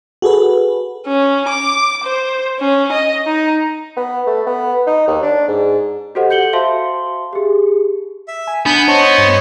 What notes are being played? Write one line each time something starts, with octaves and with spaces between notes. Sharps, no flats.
F#4 G#4 A4 B4
C#4
D6
C5
C#4
D#5
D#4
B3
A3
B3
D#4
D#2
D4
G#2
F#4 G4 A4 C5 D#5 F#5
A4 G6 C#7 F#7 G7
F#4 C5 E5 F5 A5 C6
G4 G#4
E5
G#5
B3 D4 G#5 D#6 G6
C5 C#5 D#5 A5
G2